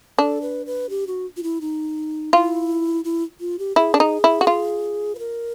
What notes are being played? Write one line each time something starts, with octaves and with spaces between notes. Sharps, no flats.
D4 A4
B4
B4
G4
F#4
F4
E4
D#4
E4 F4
E4
F4
G4
E4 G#4
D4
D#4
E4
F#4
F4
B4
A#4